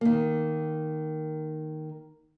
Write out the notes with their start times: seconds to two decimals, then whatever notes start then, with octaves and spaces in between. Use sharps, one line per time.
0.01 D#3 A#3